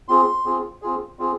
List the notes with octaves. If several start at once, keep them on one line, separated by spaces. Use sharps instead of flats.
C4 F4 G#4 C6
C4 F4 G#4
C4 F4 G#4
C4 F4 G#4